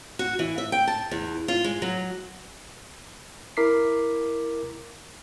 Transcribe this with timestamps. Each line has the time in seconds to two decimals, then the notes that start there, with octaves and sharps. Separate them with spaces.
0.19 F#4
0.39 E3
0.58 E5
0.72 G5
0.87 A5
1.11 E2
1.48 F4
1.64 G#3
1.82 F#3
3.57 E4 A#4 D6 B6 C7